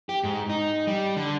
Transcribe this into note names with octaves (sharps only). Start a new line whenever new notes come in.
G4
G#2
D#4
G3
D3